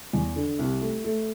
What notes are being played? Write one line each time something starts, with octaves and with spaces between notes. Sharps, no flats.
E2
D3
C2
A3
A3